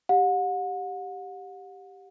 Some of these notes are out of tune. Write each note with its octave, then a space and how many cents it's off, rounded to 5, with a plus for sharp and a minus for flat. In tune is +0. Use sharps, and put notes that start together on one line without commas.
G4 +0 F#5 -35